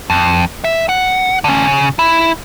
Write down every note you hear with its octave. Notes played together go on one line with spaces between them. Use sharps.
F2
E5
F#5
D3 C#4
C#3
E4